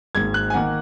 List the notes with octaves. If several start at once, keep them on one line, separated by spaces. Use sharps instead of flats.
G#1 G#2 D#3 A#3 G#6
F#6
G#5
D#3 A#3 F#5